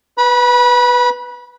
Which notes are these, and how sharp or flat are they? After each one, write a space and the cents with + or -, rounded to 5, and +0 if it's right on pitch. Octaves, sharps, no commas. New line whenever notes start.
B4 +0 B5 -30